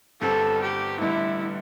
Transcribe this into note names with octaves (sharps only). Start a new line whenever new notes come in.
G1 G2 G3 C4 A4
G4
A1 G2 D3 G3 E4